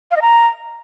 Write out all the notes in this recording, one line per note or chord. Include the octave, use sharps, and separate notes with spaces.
F5
D#5
A#5